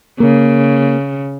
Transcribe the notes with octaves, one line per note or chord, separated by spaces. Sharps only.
C#3 A#3